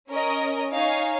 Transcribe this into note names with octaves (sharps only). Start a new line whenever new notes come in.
C#4 A#4 D#5
D#4 C#5 F5 G#5